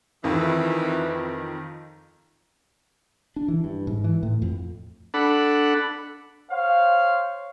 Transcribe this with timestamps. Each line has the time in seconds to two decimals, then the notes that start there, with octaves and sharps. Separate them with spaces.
0.24 F2 D#3 E3
3.36 D4
3.48 E3
3.64 G2
3.87 G#2
4.04 E3
4.23 A2
4.42 F2
5.14 D4 A4 F#5 B5
6.51 C5 C#5 F5